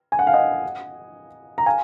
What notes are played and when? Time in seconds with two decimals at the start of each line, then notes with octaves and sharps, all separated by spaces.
0.12 G#5
0.19 F#5
0.27 F5
0.34 D#5 F#5
1.58 A#5
1.66 F5 G#5